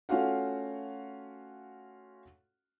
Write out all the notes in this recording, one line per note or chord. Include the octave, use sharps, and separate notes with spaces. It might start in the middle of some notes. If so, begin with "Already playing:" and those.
A3 C#4 F4 F#4 F5 F#5